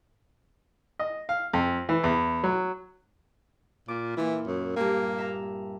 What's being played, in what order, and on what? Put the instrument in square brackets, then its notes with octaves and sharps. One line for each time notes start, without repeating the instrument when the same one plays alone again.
[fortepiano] D#5
F5
F2
E3
E2
F#3
[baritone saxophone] A#2 [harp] D6
[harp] A#2 E4 [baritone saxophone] E3
[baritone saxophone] F#2
[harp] G2 G4 G#5 [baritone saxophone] A#3
[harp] E5 A#5